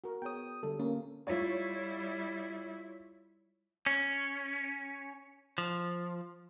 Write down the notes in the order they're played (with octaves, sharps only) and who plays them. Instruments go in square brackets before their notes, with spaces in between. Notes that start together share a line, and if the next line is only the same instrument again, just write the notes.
[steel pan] F#4 A#4
[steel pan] B3 G#4 C#5 [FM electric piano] G5 D#6
[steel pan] D3 G3 [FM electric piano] A4
[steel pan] A#3 [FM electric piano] C#4
[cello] G3 E4 [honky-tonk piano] F4 C#5
[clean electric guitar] C#4
F3